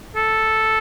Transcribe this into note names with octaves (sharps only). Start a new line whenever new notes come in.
A4